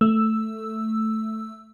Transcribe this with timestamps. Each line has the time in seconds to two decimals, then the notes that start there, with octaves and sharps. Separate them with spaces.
0.01 A3 E6